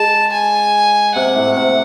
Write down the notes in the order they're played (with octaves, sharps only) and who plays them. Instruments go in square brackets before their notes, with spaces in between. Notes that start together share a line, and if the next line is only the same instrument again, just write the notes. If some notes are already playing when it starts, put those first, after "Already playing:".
Already playing: [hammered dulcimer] G#3 [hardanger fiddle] A5
[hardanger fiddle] G#5
[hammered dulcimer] C3 [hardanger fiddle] F#5
[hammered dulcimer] A2
C3